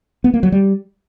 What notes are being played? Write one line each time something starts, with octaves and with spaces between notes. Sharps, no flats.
B3
A#3
F#3
G3